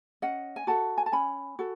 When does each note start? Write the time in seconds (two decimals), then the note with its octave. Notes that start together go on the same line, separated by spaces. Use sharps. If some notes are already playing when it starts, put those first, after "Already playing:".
0.22 C#4 D#5 F#5
0.56 G#5
0.67 F#4 A4 F#5 A5
0.98 G#5
1.06 A5
1.12 C#4 G#5 B5
1.59 F#4 A4